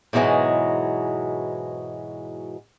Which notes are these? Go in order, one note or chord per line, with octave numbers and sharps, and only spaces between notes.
G#2 B2 E3 F#3 G#3